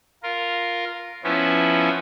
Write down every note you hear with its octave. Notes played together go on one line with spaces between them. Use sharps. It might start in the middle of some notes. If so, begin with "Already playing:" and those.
F4 A#4
F3 B3 C#4 E4